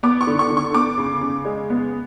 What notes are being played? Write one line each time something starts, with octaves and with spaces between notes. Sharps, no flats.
B3 D6
C#6
D3
C#6
D3
C#6
B3 D6
C#3
C#3
G#3
B3